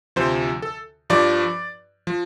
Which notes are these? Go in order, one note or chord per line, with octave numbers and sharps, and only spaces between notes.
D2 C3 F3 C5
A4
G2 F3 D5
F3